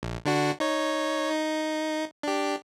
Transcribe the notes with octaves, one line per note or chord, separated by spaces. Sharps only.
A#1
D3 D4 F#4
D#4 C#5
D#4
D4 G4